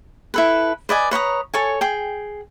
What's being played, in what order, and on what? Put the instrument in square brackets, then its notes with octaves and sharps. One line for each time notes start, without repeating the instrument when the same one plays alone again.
[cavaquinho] E4 A4 B4
B4 D5 D#5 G#5
B4 C#5 A#5 D#6
A4 C#5 G#5
G#4 G5